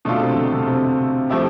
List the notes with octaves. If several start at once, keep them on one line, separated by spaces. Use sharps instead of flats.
B2 D3 A3 D4 F4 A4
C3
D3
D3
C3
F3 A3 E4 G4